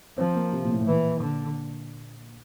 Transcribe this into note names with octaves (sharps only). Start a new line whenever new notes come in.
F3 C4
A#3
C3
A#2
A2
A2
A#2 E3
D3